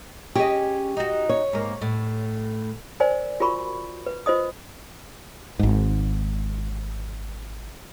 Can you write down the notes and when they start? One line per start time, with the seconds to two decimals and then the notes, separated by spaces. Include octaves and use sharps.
0.35 C#4 G4 G#4 D#5
0.97 D#4 F#4
1.29 C#5
1.53 G#2 A#3
1.81 A2
3.00 A#4 C5 D5 G#5
3.40 F4 F#4 A#4 B5 C#6
4.06 B4
4.26 F4 C5 D#5 D#6
5.59 G#1 G#2